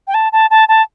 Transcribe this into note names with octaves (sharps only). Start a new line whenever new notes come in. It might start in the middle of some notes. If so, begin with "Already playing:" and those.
G5
A5
A5
A5
A5